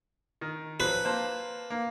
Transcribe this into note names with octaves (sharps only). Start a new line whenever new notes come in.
D#3
F3 F#3 C4 B4
A#3 C5 A5
A#3